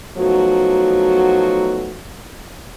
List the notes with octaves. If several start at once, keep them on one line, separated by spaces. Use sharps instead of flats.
F3 F#3 A3 B3 D#4 F#4